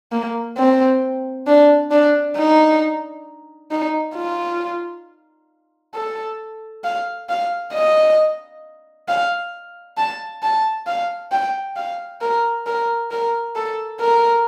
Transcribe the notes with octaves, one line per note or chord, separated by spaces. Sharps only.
A#3
C4
D4
D4
D#4
D#4
F4
A4
F5
F5
D#5
F5
A5
A5
F5
G5
F5
A#4
A#4
A#4
A4
A#4